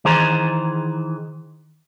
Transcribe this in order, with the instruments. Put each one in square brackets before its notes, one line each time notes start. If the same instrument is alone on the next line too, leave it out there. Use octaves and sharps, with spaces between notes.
[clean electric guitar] D#3 E3 G#4 C5 A#5